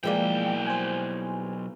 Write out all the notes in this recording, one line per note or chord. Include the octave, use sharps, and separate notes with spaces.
B1 E3 F3 G3 G#3 A#3 D5 G5
C5 G#5